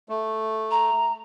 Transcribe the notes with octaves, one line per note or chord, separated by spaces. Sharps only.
A3
A#5